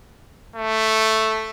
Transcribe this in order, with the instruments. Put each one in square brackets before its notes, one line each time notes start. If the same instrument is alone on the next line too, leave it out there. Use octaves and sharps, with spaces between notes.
[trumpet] A3